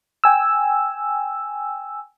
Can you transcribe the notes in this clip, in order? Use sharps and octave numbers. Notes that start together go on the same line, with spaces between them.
G5 G#5 E6